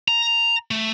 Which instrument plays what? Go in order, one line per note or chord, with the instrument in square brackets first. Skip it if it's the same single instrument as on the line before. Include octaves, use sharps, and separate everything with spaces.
[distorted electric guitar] A#5
A3